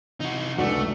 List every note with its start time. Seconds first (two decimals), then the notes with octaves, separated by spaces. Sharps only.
0.20 C3 E3 D#4 F#4
0.58 C#2 F#2 A3 D4 F#4